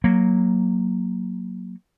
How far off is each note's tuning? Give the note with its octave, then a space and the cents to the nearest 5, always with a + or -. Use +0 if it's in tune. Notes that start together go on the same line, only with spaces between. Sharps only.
F#3 +0 A#3 +0